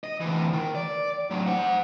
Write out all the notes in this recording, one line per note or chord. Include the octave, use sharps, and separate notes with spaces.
D#5
D2 E3
D#3
D5
A2 F#3
C5 F#5